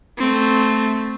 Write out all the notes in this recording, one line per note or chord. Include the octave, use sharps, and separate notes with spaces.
A3 C4